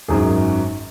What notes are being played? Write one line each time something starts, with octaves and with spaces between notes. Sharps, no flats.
G#1 F#2 D#3 G#4